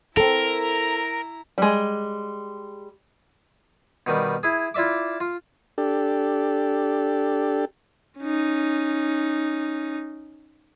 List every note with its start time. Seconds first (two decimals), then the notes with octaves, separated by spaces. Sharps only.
0.17 C4 E4 A4 A#4 A#5
1.58 G3 G#3
4.07 B2 D#3 G3
4.43 E4 G#4
4.74 E4 F4 D5 E5 D6
5.20 F4
5.78 D4 G4 A4
8.19 C#4 D#4